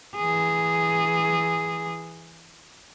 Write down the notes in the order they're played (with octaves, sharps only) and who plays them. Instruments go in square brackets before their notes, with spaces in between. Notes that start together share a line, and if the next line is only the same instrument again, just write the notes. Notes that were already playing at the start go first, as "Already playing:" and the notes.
[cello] E3 G#4